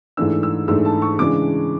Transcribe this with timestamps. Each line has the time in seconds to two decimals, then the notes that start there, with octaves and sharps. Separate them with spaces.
0.17 G#2 E3 A3 D4 E6
0.43 E6
0.68 G#2 E3 A3 D4 E6
0.85 A5
1.02 C#6
1.19 C#3 E3 G#3 D4 D6